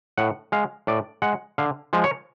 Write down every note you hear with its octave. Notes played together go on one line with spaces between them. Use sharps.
A2 F#5
G#3 F5
A2 D5
G#3 F#5
D3 F5
F3 G#3
C#5